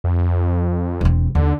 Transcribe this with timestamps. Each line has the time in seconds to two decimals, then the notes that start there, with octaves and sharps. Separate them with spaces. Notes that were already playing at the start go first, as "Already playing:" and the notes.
0.04 F2
1.01 E1 C4
1.35 D#2 D3